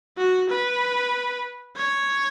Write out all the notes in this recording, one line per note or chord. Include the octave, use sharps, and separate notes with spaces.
F#4
B4
C#5